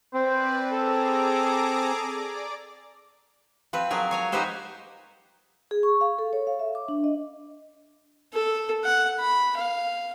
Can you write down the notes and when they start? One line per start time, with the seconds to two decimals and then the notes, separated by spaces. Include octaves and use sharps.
0.14 C4 B4 C5 D5
0.71 G#4 A4 A#5 D6
1.99 D5
3.73 F3 C4 B4
3.90 F3 F#3 G#4 A#4
4.11 C#5 G#5 A#5
4.32 D#4 F#4 G4 B4 C5 D#5
5.71 G#4
5.83 C#6
6.01 F5
6.18 A4
6.33 C#5
6.47 F5
6.59 E5
6.75 D6
6.88 D4
7.04 D#5
8.33 A4
8.85 F#5
9.20 B5
9.57 F5